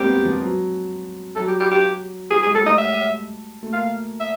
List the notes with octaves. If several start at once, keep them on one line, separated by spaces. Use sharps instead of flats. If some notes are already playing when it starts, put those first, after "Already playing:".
Already playing: G3 G#3 A#3 C4 G4
B3
F3
F#3
F#3 A4
G4
G4
G4
G3 G#4
G#4
G#3
A4
A3 D#5
E5
A3
A#3 F5
E5